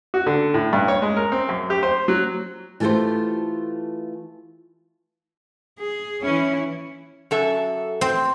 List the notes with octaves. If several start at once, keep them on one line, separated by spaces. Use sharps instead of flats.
F#4
D3
A2
G2
C#5
G#3
A#4
C4
F#2
G4
C5
F#3
E3 A3 F4 G4 A4 C5
G#4
E3 C#4 E4
F#2 A4 E5
C4